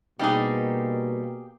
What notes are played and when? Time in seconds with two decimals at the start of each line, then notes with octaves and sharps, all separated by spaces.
0.19 B2 G3 A#3 C4 D#4 G4 G#4